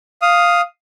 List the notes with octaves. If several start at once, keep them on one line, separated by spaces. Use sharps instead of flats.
F5 D#6